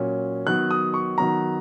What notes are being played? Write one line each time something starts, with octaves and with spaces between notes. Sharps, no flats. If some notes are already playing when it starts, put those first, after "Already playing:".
Already playing: A#2 F#3 C#4
D#3 F#3 B3 F#6
D#6
C#6
D#3 F#3 B3 A#5